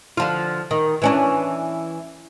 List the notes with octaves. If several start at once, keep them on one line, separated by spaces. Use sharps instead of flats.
D3 F3 F4
D#3
E3 C#4 D4